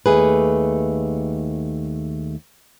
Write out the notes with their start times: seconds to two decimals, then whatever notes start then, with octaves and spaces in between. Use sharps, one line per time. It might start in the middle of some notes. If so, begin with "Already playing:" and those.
0.06 D#2 A3 G#4 B4